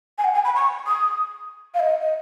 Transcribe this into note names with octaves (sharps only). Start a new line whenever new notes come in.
G#5
F#5
G#5
B5
C#6
D#6
F5
D#5
D#5